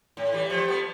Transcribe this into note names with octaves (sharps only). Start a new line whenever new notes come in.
A2
E3 G3
F3 A3
G3 B3